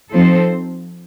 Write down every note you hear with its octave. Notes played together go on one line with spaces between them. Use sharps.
F3 C4 D#4 A4 C5